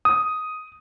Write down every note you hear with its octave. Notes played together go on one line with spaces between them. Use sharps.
D#6